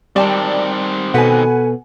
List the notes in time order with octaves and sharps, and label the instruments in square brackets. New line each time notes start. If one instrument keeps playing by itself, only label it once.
[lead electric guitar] D#3 C4 [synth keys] G3 [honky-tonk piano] D5 G5 A5
[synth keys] B2 B4 [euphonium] A4 [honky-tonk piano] F#5 G#5